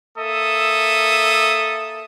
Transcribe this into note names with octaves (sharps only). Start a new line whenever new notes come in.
A#3 A4 E5 D#6